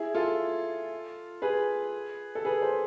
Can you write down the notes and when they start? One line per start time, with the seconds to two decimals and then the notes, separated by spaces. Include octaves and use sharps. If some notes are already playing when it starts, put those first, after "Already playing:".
Already playing: E4 G#4
0.15 F4 A4
1.42 G#4 B4
2.35 A4
2.45 G#4 B4
2.61 A4 C5